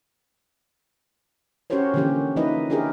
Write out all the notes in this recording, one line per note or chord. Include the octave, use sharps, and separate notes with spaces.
C#4 F#4 G4 A#4 C5 C#5
D3 E3 F3 A#3 C#4 G4
F3 A#3 D#4 E4 B4 D#5
D4 E4 G4 G#4 A#4